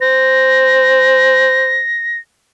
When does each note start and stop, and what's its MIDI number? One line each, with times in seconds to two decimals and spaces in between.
0.01 1.81 72
0.01 2.18 94